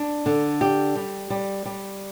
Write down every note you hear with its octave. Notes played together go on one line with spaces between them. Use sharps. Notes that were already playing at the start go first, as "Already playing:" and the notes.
Already playing: D4
D3
G4
G3
G3
G3